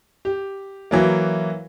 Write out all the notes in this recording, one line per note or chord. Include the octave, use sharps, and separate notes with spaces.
G4
E3 F#3 A#3